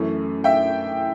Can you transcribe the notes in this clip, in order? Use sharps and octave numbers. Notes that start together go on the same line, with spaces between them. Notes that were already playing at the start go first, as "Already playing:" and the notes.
Already playing: F#2 E3 A3 C#4
E5 G5